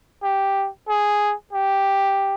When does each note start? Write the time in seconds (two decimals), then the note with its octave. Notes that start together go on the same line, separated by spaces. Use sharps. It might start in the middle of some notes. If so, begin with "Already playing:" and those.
0.23 G4
0.88 G#4
1.53 G4